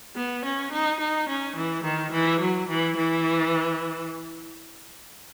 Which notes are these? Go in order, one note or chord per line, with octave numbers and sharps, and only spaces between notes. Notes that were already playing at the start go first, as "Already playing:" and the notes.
B3
C#4
D#4
D#4
C#4
E3
D#3
E3
F#3
E3
E3